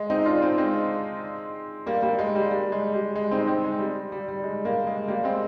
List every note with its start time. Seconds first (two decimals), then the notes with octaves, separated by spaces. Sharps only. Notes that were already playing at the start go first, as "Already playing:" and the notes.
Already playing: G#3
0.10 C4 D#4
0.25 D4 F4
0.42 C4 D#4
0.58 G#3 C4
1.86 G3 A#3
2.02 G3 A#3
2.19 G#3
2.35 G3
2.51 G3
2.72 G#3
2.94 G3
3.16 G#3
3.31 C4 D#4
3.48 G#3 C4
3.64 G#3
3.79 G3
4.12 G3
4.28 G3
4.43 G#3
4.65 G3 A#3
4.87 G#3
5.08 G3 A#3
5.24 G#3 C4